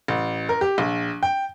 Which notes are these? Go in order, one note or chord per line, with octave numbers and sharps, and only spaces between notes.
A1
A#4
G4
A#1
G5